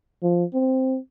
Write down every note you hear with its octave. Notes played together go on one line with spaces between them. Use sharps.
F3
C4